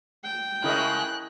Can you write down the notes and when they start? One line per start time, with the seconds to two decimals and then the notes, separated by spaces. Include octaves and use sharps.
0.24 G5
0.64 C#3 G#3 A3 E4 A#4 D#5 F#6